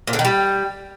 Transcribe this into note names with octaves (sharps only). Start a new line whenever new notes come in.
A#2
D3
D#3
G3